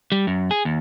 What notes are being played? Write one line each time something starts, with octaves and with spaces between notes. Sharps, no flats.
G3
F#2
G#4
D#2